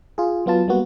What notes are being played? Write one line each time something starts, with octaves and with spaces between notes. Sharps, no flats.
F4 G#4
F#3 B3 F4 A5
G3 A#3 B3 F#4